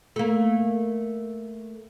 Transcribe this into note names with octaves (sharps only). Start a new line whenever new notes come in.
A3 A#3